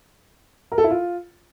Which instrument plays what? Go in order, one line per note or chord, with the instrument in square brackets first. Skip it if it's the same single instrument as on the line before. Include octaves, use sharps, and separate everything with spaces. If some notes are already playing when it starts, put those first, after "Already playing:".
[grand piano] A#4
A4
E4
F4